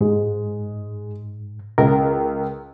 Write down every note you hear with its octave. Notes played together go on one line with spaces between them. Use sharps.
G#2 G#3
C#2 A#4